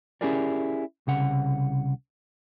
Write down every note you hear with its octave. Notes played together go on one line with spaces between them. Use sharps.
C#4 E4 G4 G#4 A#4 D5
C2 C#3 F#5